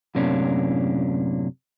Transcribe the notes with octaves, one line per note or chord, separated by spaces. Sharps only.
F#2 A2 C3 A#3 C#4 D4